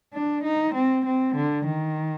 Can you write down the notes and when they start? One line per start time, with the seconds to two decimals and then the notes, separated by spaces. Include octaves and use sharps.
0.14 D4
0.44 D#4
0.74 C4
1.06 C4
1.35 D3
1.66 D#3